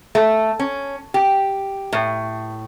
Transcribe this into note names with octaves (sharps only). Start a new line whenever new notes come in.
A3
C#4
G4
A2